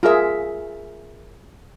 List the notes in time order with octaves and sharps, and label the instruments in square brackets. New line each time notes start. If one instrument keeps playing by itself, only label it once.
[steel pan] F4 G#4 [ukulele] A#4 E5